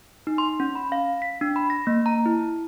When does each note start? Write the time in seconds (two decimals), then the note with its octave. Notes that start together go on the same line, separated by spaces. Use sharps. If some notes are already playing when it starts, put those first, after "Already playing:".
0.27 D#4
0.38 C6
0.60 C#4
0.75 B5
0.92 F5
1.22 B6
1.41 D4
1.56 B5
1.70 A#6
1.87 A#3
2.06 A#5
2.26 E4